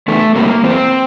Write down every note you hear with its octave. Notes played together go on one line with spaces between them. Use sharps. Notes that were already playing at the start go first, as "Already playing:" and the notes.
E2 A3
C3 G3 A#3
E2 C4